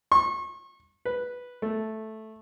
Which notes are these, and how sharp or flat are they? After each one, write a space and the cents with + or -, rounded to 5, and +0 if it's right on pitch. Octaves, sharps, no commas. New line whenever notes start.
C#6 -35
B4 -5
A3 -5